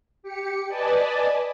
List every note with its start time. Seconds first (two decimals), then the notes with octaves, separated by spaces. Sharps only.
0.23 G4 C#7
0.68 B4 D5 D#5 G#5 A5